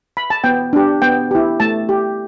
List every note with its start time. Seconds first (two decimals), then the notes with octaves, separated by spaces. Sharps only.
0.17 B5
0.30 A5
0.44 B3 G5
0.73 D4 G4
1.02 B3 G5
1.31 E4 G4
1.60 A3 A5
1.89 G4